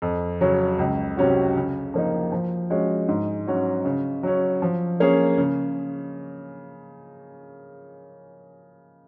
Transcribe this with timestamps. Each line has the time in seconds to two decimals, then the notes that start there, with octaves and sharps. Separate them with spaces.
0.02 F2
0.41 C#3 F#3 C#4
0.79 C#2
1.17 C3 F#3 C#4 F#4
1.56 C#3
1.94 F3 A#3 D#4
2.32 F3
2.70 G#3 C#4 F#4
3.08 G#2
3.47 F#3 C#4 F#4
3.85 C#3
4.23 F#3 C#4
4.62 F3
5.00 A#3 C#4 G#4
5.37 C#3